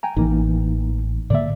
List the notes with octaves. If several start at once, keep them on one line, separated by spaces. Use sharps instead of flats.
G5 G#5 A#5
A1 E3 A#3 D#4
A2 D3 A#3 D5 E5